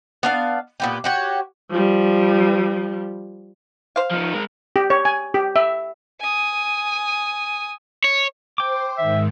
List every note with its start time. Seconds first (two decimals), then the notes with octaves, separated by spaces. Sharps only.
0.23 B3 D4 F5
0.80 A#2 B3 G4
1.04 F#4 G4 C#5
1.70 F3 G3
3.96 C5 F5
4.11 F3 D#4
4.34 G#3 A#4
4.76 G4
4.90 C#5
5.05 G#5
5.34 G4
5.56 E5
6.20 G#5 D#6
8.04 C#5
8.58 C5 G5 D6
8.98 G#2 D#3 E5